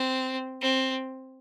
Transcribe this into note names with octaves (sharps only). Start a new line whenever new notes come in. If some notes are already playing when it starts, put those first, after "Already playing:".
Already playing: C4
C4